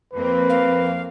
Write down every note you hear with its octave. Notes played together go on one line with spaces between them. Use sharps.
F2 A#3 C4 B4
F5